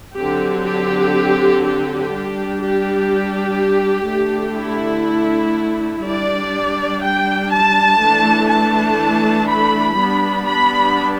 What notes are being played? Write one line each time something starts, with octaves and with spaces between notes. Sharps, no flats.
D3 F#3 C4 G4
G4
G4
G3 D4
G4
D3 A3 D4
E4
G3 D4 D5
G5
A5
E3 A3 D4
A5
B5
G3 B3 D4
B5